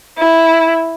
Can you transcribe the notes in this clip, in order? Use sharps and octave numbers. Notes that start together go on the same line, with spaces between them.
E4